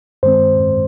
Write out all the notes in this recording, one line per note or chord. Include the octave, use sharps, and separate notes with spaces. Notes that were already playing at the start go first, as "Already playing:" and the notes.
G2 D#3 G#3 C4 C5